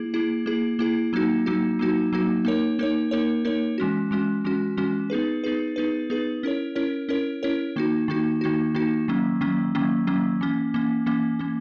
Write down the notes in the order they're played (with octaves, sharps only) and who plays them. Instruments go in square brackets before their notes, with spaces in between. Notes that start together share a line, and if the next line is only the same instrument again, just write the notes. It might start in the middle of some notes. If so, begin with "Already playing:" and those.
Already playing: [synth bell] A#3 E4 G#4
A#3 E4 G#4
A#3 E4 G#4
A#3 E4 G#4
F#3 A#3 D#4 F#4
F#3 A#3 D#4 F#4
F#3 A#3 D#4 F#4
F#3 A#3 D#4 F#4
A#3 D#4 A#4 C#5
A#3 D#4 A#4 C#5
A#3 D#4 A#4 C#5
A#3 D#4 A#4 C#5
E3 G#3 C#4 F#4
E3 G#3 C#4 F#4
E3 G#3 C#4 F#4
E3 G#3 C#4 F#4
B3 D#4 G#4 B4
B3 D#4 G#4 B4
B3 D#4 G#4 B4
B3 D#4 G#4 B4
C#4 E4 A#4 C#5
C#4 E4 A#4 C#5
C#4 E4 A#4 C#5
C#4 E4 A#4 C#5
D#3 A#3 D#4 F#4
D#3 A#3 D#4 F#4
D#3 A#3 D#4 F#4
D#3 A#3 D#4 F#4
D#3 F#3 A#3 C#4
D#3 F#3 A#3 C#4
D#3 F#3 A#3 C#4
D#3 F#3 A#3 C#4
E3 A#3 C#4
E3 A#3 C#4
E3 A#3 C#4
E3 A#3 C#4